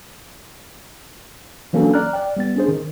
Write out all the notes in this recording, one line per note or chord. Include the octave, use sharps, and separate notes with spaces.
E3 F#3 A#3 C#4 D4 A4
D5 A#5 F6 F#6
D5 G5
G3 B3 A6
C#4 D4 G#4 C5
D#3